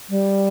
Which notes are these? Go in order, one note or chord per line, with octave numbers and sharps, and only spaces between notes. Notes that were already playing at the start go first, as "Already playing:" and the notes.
G3